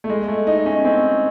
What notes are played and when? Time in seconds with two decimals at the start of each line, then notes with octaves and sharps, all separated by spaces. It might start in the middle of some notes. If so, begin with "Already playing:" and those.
0.04 A3
0.10 G#3
0.28 A3
0.47 D#4
0.66 C#4
0.85 C4